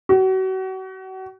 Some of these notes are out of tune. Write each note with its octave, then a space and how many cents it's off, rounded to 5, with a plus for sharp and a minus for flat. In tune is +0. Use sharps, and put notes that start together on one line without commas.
F#4 +35